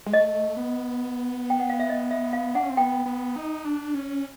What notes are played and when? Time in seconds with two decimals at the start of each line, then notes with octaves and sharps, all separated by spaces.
0.06 G#3
0.13 A3 D#5
0.57 B3
1.50 G5
1.60 F#5
1.70 F5
1.80 E5
1.89 D#5
2.11 E5
2.33 F5
2.55 D4 F#5
2.63 C#4
2.70 C4
2.77 B3 G5
3.06 B3
3.36 D#4
3.65 D4
3.94 C#4